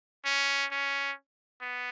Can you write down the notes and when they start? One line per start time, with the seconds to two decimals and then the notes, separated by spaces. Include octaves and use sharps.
0.25 C#4
0.71 C#4
1.61 B3